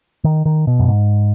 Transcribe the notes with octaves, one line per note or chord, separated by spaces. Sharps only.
D#3
D#3
B2
F#2
G#2